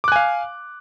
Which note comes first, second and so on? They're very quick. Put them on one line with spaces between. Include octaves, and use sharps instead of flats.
D6 F#6 G#5 F5